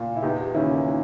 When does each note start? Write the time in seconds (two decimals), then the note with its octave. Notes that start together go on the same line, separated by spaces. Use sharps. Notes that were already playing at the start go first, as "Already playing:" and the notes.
Already playing: A#2
0.16 E4
0.23 E2 D#4 G4
0.54 D#3 C#4 E4
0.87 D#3